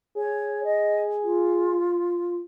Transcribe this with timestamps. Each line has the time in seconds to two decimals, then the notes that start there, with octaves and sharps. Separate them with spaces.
0.17 G#4 C#5
0.64 D#5
1.23 F4